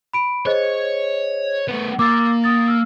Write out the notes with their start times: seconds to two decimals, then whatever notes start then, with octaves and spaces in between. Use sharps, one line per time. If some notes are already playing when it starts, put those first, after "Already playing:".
0.13 B5 D7
0.46 G#4 C5 C#5 D#5
1.68 A3 B3
1.99 A#3 D6 E6 A6
2.44 D#6 A6
2.68 E6 F6